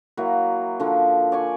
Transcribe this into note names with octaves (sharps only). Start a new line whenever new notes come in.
F#3 A#3 E4
D3 F3
D5 G#5 C#6